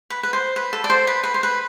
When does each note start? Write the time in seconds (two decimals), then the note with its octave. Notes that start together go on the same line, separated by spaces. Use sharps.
0.10 B4
0.23 B4
0.33 C5
0.56 B4
0.73 A4
0.84 D5
0.90 C5
1.07 B4
1.24 B4
1.34 C5
1.43 B4